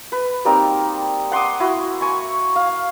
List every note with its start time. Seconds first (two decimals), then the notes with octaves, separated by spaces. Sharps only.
0.12 B4
0.45 G3 A#3 C4 D#4
1.32 F#5 C6 D6 D#6
1.60 E4 F#4
2.01 G#5 C#6
2.56 F5